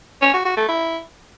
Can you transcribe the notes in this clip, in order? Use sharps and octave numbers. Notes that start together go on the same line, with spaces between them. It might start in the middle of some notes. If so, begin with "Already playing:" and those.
C#4
F#4
F#4
A3
E4